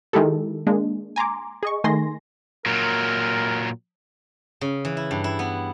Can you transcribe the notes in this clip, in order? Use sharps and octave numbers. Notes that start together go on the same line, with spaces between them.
D#3 G#3 E4 G4 A4
G#3 A#3 D4
G#5 A#5 C6 D6
G#4 D#5 C#6
D#3 A3 G#5 C6 A#6
A#2 F#3 A#4
C#3
E3
E4
G2
E4
B3